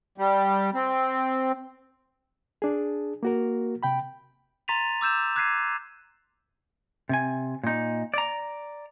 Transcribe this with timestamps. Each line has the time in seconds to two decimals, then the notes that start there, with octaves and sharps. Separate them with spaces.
0.18 G3
0.74 C4
2.62 D4 G#4
3.23 A#3 F#4 A#4
3.83 C3 G5 B5
4.68 A#5 C6 A6 B6 D#7 F7
5.01 D6 E6 G6 E7
5.36 D6 F#6 G#6 B6 C7 D#7
7.09 C3 G#5
7.64 A#2 D#4
8.14 D5 A#5